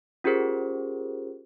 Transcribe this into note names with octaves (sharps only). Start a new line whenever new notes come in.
C#4 F4 G4 G#4 A#4 C5